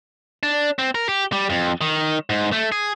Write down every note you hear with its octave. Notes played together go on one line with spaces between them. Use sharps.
D4
C4
A#4
G4
G3
F2
D#3
G#2
A3
G#4